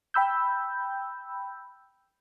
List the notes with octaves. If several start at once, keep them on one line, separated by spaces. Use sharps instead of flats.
G5 B5 E6 G6